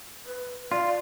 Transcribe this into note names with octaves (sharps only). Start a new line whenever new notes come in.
B4
F4 D5